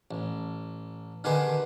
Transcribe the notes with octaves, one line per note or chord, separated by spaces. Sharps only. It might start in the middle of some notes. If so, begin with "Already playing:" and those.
A1
D3 D#3 G4 G#4 B4 C6